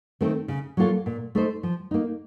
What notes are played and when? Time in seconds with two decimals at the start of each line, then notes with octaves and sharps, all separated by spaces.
0.21 D#3 A3 C4
0.48 C#3
0.77 F#3 A#3 F4 A4
1.06 A#2
1.35 A3 D#4 A4 C5
1.63 F3
1.91 A#3 D#4